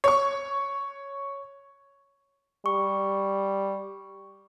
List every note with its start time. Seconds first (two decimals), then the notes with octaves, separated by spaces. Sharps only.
0.04 C#5 C#6
2.66 G3 C#6